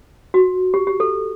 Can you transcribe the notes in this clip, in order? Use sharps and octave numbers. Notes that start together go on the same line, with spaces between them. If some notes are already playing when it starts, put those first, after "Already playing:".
F#4
G4
G4
A4